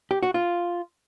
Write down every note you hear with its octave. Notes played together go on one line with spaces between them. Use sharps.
G4
F#4
F4